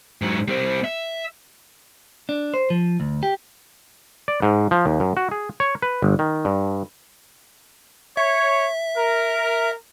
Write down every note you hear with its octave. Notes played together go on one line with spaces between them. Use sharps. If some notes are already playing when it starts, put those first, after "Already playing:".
G#2 F#3
G3 C4
E5
D4
C5
F3
D2
G4
D5
G#2
F3
D#2
F#2
F#4
G#4
C#5
B4
G1
D#3
G2
C#5 E5
A#4